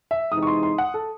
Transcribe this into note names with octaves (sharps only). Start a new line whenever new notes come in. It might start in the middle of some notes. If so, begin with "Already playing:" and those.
E5
C3 E3 G#3 D#4 D#6
C#6
C6
C6
F#5
A4